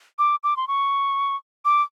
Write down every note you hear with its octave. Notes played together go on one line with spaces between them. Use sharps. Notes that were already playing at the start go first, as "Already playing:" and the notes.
D6
D6
C6
C#6
D6